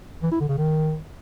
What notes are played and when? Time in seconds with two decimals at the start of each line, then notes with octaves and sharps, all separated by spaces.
0.23 E3
0.32 E4
0.40 D3
0.49 C#3
0.57 D#3